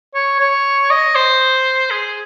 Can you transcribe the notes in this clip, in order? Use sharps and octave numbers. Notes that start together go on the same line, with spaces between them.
C#5
C#5
D#5
C5
G#4